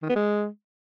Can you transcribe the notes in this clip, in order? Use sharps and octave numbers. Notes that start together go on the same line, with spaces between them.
D#3
B3
G#3